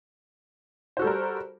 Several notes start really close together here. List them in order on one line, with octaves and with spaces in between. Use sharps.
C5 F#4 A4 G3 A#4